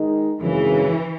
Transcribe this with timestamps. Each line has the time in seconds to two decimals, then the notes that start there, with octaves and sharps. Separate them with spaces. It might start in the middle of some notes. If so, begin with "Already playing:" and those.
Already playing: D#3 G#3 D#4
0.41 G#1 F#2 C#3 E3